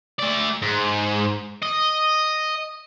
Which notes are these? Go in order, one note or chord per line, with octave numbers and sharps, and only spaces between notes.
A3 D5
G#2
D#5